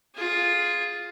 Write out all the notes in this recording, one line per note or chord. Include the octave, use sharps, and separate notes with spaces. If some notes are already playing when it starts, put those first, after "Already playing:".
F4 G#4